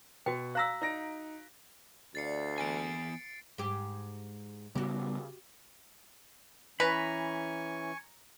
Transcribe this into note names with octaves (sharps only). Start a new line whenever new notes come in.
B2 F#4 G5
F5 A#5 E6 F#6 A#6 B6
D#4 A#6 D7
D2 D4 D5 F5 A6 C7 C#7
D#2 E3 A#3 B3 G#5 A6 D7
G#2 G4
C#3 G3 B3 F#4 G4
E3 C#4 B4 G#5 A#5 B5 C#6